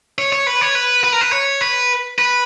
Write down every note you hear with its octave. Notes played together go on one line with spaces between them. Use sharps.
C#5
C#5
B4
C#5
B4
B4
A#4
B4
C#5
B4
B4